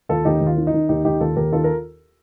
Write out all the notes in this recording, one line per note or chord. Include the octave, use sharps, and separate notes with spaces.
D#2 F4 A4
D#2 D#4 G4
D#2
F4
D#3
D#4
D#3
D#2 D#4 G4
D#2 D#4 G4
D#2 F4 A4
D#2 G4 A#4
D#3 F4 A4
A#4